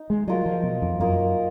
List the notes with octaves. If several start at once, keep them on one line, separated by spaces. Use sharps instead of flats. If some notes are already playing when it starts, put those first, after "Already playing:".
Already playing: D#4
G#3
F#3 A#3 F4 A#4 D#5
F3
B2
F2
F#2 A#3 F4 A#4 D#5